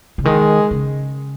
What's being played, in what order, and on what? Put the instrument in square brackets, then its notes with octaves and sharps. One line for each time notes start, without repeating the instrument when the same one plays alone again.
[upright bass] C#3
[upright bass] D#3 [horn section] G#3
[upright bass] C#3